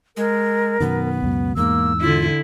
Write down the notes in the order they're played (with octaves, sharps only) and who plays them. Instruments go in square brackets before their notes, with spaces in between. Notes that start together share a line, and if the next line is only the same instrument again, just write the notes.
[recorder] G#3 [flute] A#4
[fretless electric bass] F#2 B2 D#3 [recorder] B3
[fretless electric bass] C#2 F#2 B2
[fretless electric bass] E2 G#2 [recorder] A#3 [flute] E6
[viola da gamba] D3 E4 [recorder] F4